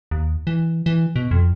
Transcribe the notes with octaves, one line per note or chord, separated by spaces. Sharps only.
D#2
E3
E3
B2
F2